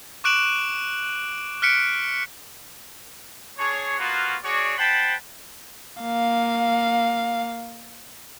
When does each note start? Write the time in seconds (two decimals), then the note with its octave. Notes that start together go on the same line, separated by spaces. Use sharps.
0.24 C#6 D6 F#6 D7 E7 F#7
1.62 F6 F#6 B6 C#7 D7
3.58 D4 G#4 C#5
3.98 A#3 B3 F4 F#4
4.44 F#4 G#4 C#5 D5
4.78 C5 F#5 G5 A5 B5
6.02 A#3 F5